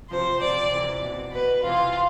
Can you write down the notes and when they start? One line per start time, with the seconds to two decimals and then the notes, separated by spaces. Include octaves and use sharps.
0.10 C3 F3 C5
0.41 C3 F3 D5
0.72 C3 E3
1.02 B2
1.33 B2 B4
1.64 C3 E3 F4